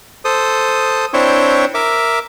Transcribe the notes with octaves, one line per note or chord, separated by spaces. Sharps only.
A4 C5 D#6
C4 D4 E4 C5 C#5 G5
A#4 E5 D6